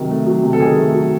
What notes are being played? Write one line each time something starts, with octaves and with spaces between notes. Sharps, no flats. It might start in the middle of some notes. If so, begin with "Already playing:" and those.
Already playing: C3 D#3 F#3
A3
F#3
C3
A4
D#3 G#4
A3
F#3